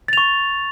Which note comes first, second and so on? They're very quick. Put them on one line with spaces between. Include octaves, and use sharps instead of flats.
A6 F7 C#6